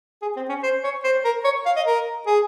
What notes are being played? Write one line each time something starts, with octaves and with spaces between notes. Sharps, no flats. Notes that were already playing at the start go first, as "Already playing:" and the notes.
G#4
C4
C#4
C5
C#5
C5
A#4
C#5
F5
D#5
A#4
G#4